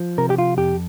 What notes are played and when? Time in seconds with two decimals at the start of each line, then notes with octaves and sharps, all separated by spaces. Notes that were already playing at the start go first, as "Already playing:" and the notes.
Already playing: F3
0.18 C3 A#4
0.30 G4
0.38 F4
0.57 F2 G4